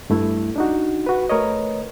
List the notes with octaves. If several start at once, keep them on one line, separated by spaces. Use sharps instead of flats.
G2 A3 E4
D4 D#4 F#4
F#4 B4
A3 A#4 B4 C#5 D#5